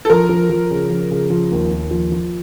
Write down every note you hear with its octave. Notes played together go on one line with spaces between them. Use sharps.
A4
F3 A#4
F3
F3
C#3
F3
C#3
F3
D#2
D#2
F3
F3